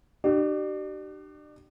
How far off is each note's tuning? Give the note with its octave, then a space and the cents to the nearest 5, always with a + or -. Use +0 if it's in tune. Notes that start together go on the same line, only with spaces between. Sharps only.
D4 +40 G4 -35